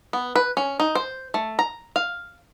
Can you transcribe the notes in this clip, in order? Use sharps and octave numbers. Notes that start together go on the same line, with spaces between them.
B3
B4
C#4
D#4
C5
A3
A#5
F5